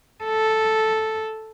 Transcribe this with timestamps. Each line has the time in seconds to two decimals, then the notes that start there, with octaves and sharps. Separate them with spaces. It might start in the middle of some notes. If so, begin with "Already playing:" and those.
0.24 A4